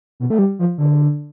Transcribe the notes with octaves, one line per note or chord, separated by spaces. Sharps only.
B2
A3
G3
F3
D3